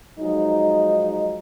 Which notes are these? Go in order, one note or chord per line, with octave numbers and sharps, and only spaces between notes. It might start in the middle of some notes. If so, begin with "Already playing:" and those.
F3 F#3 G#3 D#4